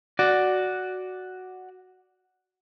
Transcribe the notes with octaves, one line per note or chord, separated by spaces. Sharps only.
F#4 D5